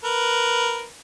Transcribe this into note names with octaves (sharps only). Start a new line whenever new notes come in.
A#4 B4